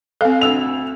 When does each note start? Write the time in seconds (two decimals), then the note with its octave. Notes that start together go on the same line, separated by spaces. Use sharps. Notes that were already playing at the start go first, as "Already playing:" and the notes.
0.21 C4 A4 F5
0.41 D2 E6 F7